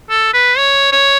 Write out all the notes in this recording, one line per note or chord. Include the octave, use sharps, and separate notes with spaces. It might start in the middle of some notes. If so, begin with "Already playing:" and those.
A4
B4
C#5
C#5